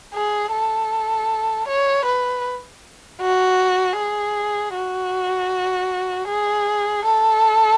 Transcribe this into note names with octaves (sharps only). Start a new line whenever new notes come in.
G#4
A4
C#5
B4
F#4
G#4
F#4
G#4
A4